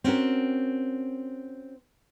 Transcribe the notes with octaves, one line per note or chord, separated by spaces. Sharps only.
C4 C#4 F#4 A#4